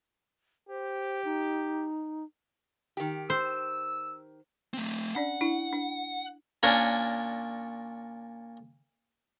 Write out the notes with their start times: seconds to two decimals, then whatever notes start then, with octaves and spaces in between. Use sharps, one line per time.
0.69 G4 C5
1.25 D#4
2.97 D#3 G4
3.30 C5 E6
4.74 A3 C4
5.15 C#4 D4 D5 F#5
5.41 D4 E4
5.73 D4
6.63 A#2 C#4 D4 A#4 C#5